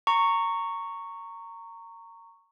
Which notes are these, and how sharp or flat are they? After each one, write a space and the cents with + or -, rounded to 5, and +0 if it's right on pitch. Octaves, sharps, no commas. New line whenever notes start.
A#5 -20 C#6 +0